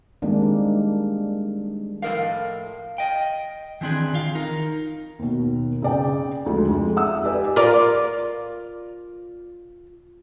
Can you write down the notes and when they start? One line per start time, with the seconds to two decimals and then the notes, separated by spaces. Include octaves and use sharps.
0.22 D#3 G3 G#3 A#3 C4 D4
2.02 A2 F3 A#4 D#5 F5
2.98 D#5 G5
3.81 D#3 E3 C4 D4 G#4
4.13 D#3 F4 F5
4.35 D#4 A#4
5.19 D#2 B2
5.82 C#3 D5 G5
6.46 D2 D3 F3 G#3
6.71 F2 G#3
6.96 E5 F#5 D#6 E6
7.24 G4 B4 D5 D#5 G#5
7.56 F4 A#4 D5